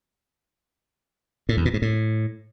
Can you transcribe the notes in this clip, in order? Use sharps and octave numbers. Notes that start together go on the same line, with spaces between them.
A2
E2
A#2
G#2
A2